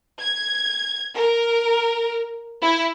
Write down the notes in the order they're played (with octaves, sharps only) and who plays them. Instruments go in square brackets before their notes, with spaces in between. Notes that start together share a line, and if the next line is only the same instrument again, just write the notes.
[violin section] G#6
A#4
E4